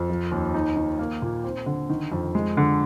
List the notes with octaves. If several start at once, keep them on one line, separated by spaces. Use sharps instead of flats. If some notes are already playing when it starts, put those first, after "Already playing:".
Already playing: F2
F3
D#2
D#4
D#3
A#3
A#2
C4
D3
D#3
F2
G#3
D3